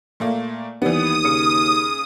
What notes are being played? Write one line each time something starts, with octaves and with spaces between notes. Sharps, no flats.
A#2 A3 A#3
D#2 E3 G3 B3 D#6
C#3 C#7